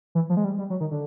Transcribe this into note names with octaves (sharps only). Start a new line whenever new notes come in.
E3
F3
G#3
G3
G3
F#3
D#3
D3